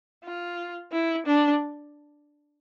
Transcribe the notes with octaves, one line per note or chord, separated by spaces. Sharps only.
F4
E4
D4